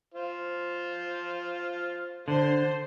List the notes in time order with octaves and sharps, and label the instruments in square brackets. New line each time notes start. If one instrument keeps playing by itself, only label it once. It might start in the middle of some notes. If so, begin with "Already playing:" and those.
[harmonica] F4 C5
[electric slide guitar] D3 [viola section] C5